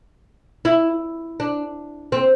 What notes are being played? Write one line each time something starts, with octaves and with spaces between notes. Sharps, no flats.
E4
D4
C4